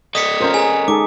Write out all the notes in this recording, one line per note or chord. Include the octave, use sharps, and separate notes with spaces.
A4 D5 D#5 D#6 B6 C#7
C#4 F4 A#4 C5
G#4 G#5 A#5
G#3 D#4 G#4 A4 D6